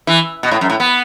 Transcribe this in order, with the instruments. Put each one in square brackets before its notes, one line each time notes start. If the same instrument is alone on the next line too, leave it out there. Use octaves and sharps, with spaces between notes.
[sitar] E3
B2
A2
F#2
A2
B3